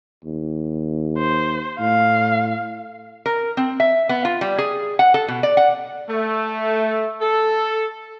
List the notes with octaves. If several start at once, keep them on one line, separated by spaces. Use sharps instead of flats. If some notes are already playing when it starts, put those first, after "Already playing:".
D#2
C5
A2 F5
A#4
C4
E5
B3
F4
G3
G#4
F#5
A4
B2
D5
F#5
A3
A4